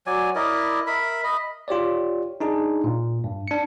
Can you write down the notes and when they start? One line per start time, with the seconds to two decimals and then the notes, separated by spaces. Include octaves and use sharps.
0.07 F#3 D5 G#5
0.35 E4 A#4 D5 D#5
0.87 A#4 E5 B5
1.24 D#5 B5
1.68 F4 G4 C#5 D5
2.40 D4 D#4 G#4
2.84 A#2
3.24 G2
3.48 D4 C#7